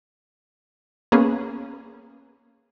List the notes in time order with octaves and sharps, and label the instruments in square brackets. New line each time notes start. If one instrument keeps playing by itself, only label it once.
[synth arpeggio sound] A#3 B3 C#4 G#4